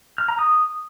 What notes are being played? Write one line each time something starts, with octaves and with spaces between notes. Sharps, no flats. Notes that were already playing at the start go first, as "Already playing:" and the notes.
F6
A#5
D#6